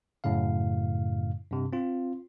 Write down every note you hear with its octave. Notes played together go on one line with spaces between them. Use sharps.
F#2 A2 C#3 F5
G2 C3
C4 F4